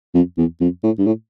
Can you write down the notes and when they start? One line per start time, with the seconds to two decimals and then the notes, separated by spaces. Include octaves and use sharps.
0.15 F2
0.38 E2
0.61 F2
0.84 A2
0.99 G2
1.07 A2